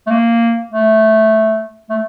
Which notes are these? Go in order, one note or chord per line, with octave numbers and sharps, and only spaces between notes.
A3
A#3
A3
A3